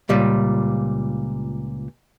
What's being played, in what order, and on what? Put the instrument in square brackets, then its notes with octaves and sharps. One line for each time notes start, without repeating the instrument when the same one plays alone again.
[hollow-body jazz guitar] C#2 A#2 G3